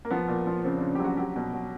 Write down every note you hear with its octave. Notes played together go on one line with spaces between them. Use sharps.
A#3
F3 B3
A#2
F3
C#3 C4
C#3 D4
G4
F#3
F#4
F#3 G4
B2
F#3